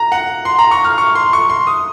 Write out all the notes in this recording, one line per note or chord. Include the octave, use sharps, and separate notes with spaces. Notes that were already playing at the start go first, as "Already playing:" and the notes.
Already playing: A#5
F#5
C6
A#5
C#6
F6
C#6
C6
C#6
C6
D#6